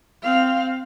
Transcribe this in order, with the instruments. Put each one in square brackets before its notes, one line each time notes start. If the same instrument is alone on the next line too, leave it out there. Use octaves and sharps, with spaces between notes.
[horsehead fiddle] C4 F5